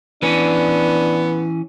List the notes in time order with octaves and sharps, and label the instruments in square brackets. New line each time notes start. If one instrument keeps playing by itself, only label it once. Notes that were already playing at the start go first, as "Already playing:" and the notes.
[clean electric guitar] E3 C#4 [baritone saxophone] B3 [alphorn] D4